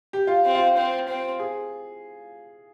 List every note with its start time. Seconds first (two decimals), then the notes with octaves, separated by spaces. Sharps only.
0.13 G4
0.27 F4
0.45 C4
0.54 F4
0.77 C4
1.08 C4
1.40 G#4